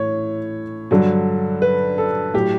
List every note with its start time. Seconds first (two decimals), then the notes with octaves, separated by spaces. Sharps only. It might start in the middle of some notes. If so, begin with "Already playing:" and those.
Already playing: A2 E3 C#5
0.91 G2 D3 F#3
1.62 B4
1.98 A4
2.34 A2 F#3 G4